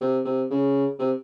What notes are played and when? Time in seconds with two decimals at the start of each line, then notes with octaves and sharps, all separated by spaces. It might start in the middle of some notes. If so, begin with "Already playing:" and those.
0.01 C3
0.25 C3
0.50 C#3
0.99 C3